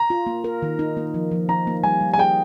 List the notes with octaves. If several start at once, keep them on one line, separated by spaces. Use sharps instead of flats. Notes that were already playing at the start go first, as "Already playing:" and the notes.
Already playing: A#5
F4
A#3
A#4
D#3
D#4
A#3
F3
F3
D#4 A#5
A#3
G3 G#5
G3
G#5
G#4 G5